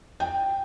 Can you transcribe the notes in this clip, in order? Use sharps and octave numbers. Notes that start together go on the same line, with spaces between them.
G5